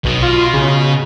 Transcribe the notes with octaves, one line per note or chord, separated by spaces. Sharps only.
B1 B2
F4
C#3